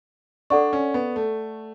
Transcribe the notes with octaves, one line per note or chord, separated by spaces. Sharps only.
D4 A4 D5 F#5 C#6
C#4
B3
A3